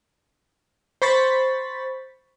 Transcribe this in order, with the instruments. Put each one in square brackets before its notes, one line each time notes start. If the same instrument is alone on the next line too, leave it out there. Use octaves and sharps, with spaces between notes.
[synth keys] C5 B5 C#6 A6 B6